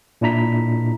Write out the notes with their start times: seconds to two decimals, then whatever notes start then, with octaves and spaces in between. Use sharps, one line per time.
0.21 A#2 D4 E4 A#5 B6